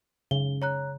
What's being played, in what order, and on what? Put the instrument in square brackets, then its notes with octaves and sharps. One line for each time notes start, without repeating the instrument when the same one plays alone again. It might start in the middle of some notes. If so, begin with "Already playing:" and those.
[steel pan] C#3 [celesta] G7
[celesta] C#5 A#5 F#6